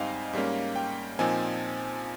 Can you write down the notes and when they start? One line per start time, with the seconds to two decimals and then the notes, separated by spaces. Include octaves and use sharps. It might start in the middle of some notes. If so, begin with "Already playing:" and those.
Already playing: G#2 G3 C4 D#4 D#5 F5 G#5
0.33 G#2 G3 A#3 C#4
0.76 G5
1.19 A#2 F3 C4 D#4 G#5